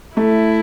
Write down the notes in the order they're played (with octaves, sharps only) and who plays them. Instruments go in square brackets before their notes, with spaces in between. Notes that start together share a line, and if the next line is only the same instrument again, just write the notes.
[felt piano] A3 [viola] E4